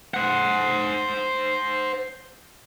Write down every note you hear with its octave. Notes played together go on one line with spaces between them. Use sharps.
C5 F#5